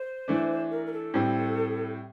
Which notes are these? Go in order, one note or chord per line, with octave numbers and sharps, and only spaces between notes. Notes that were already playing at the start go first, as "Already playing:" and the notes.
Already playing: C5
E3 A3 D4
A#4
A#4
A4
A2 G3 C4